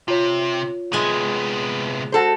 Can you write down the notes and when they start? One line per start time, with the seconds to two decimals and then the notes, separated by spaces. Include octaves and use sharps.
0.08 C3 F4 C#5
0.93 C3 G#3 B3 G#5
2.12 F#4 A4 C5